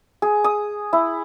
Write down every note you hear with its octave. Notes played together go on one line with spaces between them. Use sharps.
G#4
D#6
E4